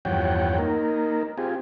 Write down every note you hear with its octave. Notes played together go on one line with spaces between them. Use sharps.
E2 G2 F3 C#5 F#5 G5
A#3 D#4 A#4
C4 F4 G4 G#4